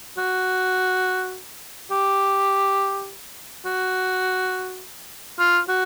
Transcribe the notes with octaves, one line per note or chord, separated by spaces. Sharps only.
F#4
G4
F#4
F4
F#4